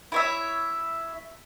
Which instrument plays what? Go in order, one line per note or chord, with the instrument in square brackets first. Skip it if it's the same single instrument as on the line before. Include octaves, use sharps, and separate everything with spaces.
[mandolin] E4 C#5 E5